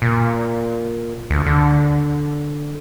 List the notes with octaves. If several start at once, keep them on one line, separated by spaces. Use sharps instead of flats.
A#2
D2
D3